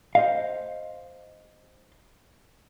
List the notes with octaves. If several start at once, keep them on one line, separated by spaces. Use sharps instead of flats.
C5 D#5 F5